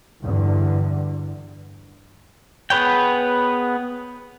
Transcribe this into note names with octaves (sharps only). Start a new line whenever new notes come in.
E2 G2 D3
B3 G#4 B4 C#5 G5